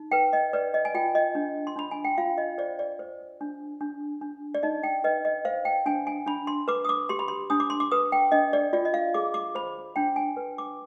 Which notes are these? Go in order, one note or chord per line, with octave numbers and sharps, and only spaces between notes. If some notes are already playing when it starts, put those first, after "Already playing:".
Already playing: D#4
B4 G5
D#5
B4 D5
D#5
G#5
F4 G5
D#5
D4
C6
D4 B5
G#5
G5
F4 F5
D#5
C5 D5
D5
C5
D4
D4
D4
D5
D#4 D#5
G5
B4 D#5
D#5
C5 F5
G5
D4 G#5
G#5
D4 B5
C6
B4 D6
D#6
D6
G4 C6
B5
C6
D4 D#6
D6
C6
D6
B4 D#6
G5
D4 D#5
D5
F4 D5
D#5
F5
G#4 D6
D6
C5 B5
D4 G5
G#5
B4
D6